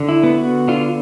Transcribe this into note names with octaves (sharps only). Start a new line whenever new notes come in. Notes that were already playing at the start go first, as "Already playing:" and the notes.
Already playing: D3
E4
B3
F#4
D3 F4